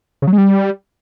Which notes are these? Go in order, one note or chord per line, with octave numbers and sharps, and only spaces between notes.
C#3
F#3
G#3
G3